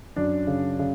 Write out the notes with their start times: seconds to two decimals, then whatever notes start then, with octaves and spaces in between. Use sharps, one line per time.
0.16 F#2 D4
0.47 C#3
0.79 C#3